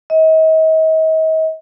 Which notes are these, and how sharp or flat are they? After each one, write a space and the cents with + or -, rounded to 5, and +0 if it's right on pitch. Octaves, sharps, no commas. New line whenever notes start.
D#5 +40